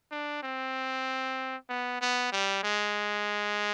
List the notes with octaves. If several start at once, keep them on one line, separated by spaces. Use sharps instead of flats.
D4
C4
B3
B3
G3
G#3